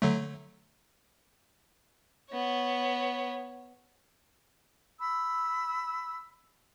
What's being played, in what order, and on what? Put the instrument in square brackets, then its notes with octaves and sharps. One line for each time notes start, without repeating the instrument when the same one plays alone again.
[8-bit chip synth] D3 F#3 A3
[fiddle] B3 C#5
[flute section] B5 E6